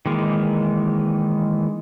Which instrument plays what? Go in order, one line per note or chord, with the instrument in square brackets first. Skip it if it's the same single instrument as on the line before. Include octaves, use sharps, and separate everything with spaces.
[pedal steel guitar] D#3 E3 G#3 A#3